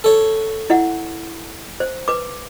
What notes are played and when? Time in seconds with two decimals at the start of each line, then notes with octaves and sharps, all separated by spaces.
0.04 A4 C#5
0.70 E4 E5 F#5
1.80 C5
2.08 B4 D6